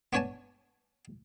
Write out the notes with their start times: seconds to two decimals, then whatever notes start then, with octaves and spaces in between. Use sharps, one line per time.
0.13 B3 D4 C#5 G#5 A5